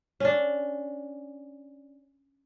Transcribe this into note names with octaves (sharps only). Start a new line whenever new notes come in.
C#4 D4